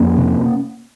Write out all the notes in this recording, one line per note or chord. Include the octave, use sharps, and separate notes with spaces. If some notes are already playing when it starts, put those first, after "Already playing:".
Already playing: F2 A#3 C#4
C3